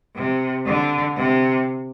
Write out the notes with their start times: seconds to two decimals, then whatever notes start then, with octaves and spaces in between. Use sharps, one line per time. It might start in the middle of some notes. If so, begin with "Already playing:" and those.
0.15 C3
0.66 D3
1.16 C3